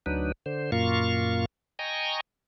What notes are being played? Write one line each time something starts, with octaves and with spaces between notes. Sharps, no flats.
D2 F#3 D4 D#4 B4
D3 C5
F#2 A#2 A#3 F4 F5 C#6
D#5 G5 G#5 A#5 C#6